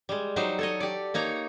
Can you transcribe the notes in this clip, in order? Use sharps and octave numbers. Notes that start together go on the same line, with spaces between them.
G3 G#3
F#3 G3 D#4 C5
A4 C#5 D#5
G4 D5
A#3 D#4 C#5 A#5